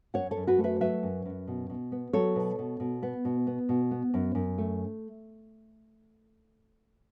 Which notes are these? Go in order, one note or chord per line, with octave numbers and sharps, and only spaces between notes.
F#2 C#5 F#5
A4 C#5
F#2
F#4 B4
A3
B4 E5
F#3 B4 E5
F#2
F#2
B2
B2
B3
F#3 A4 C#5
B2
B2
B2
B3
B2
B3
B2
B3
F#2
F#2
A3